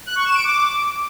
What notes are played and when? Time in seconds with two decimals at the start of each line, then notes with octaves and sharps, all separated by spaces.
0.06 F#6
0.16 C#6
0.25 E7
0.35 D7
0.44 D6